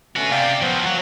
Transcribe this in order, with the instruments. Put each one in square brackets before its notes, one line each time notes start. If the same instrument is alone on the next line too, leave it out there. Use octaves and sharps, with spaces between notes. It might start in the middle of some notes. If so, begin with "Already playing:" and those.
[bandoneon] D3 A3 C#4 [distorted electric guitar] F#4 B4
[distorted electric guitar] C3 [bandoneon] D5 F5 G5
[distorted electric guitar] F3 F#3 [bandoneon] B3 C5
[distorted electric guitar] F#3 [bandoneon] A#3